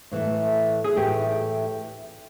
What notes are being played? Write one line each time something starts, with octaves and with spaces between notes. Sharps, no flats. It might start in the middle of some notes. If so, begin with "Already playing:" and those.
A2 E3 A3
G#4
A2 E3 A3 G4